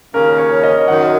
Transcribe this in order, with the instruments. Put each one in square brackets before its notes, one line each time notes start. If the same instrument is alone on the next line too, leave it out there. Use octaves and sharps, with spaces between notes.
[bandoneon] D#2 C#3 A#3 C#4 [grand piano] A#4
[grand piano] C#5
D#5
[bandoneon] F#2 D#3 F#3 D#4 [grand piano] F#5